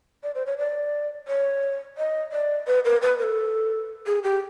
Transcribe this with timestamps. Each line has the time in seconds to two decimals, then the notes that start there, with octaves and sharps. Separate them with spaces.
0.23 D5
0.35 C5
0.46 C#5
0.58 D5
1.28 C#5
1.98 D#5
2.32 D5
2.67 B4
2.85 A#4
3.02 B4
3.19 A#4
3.23 A4
4.07 G#4
4.23 G4